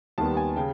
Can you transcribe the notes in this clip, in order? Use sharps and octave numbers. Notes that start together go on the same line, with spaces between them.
D#2 D#3 G3 B3 A5
G#5
C#3 G5